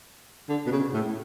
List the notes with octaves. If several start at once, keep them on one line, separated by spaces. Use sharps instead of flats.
D3
B2
C#3
A2